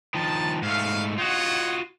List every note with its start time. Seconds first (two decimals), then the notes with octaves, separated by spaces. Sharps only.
0.14 D#3 F3 A5
0.62 G#2 A3 F5
1.18 F4 F#4 C#5 D#5 F#5